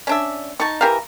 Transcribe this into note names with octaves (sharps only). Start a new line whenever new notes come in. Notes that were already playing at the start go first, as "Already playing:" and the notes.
C#4 D4 E5
D#4 A5 C#6
E3 G4 A#4 F5 A#5